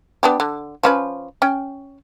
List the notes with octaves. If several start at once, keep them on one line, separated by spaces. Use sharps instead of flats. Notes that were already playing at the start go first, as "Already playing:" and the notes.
B3 D4 G4
D3
F3 C#4 B4
C#4 G5